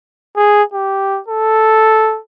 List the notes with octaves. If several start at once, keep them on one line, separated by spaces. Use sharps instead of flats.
G#4
G4
A4